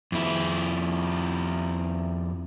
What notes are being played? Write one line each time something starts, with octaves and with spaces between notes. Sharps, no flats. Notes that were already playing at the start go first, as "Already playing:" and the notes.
F2 E4